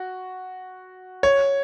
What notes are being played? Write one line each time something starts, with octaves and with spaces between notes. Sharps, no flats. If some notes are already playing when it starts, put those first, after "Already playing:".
Already playing: F#4
C#5